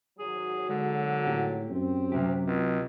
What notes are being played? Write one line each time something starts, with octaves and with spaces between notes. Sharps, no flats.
G#1 F#3 G#4
D3 G#3
A2 G4
F#2 C4
D2 C3 F#3 G4
C#2